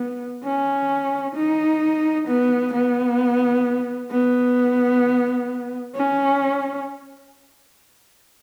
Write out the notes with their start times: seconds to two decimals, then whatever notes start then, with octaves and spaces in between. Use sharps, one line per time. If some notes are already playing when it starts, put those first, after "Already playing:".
Already playing: B3
0.44 C#4
1.35 D#4
2.28 B3
2.74 B3
4.11 B3
5.96 C#4